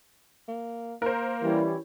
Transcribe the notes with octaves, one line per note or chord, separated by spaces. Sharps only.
A#3
A#3 A#4 C5
E3 G3 C#4 E4